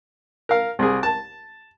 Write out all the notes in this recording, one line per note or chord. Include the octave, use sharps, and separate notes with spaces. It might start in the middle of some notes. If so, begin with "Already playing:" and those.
A#4 F5
C2 G#4
A5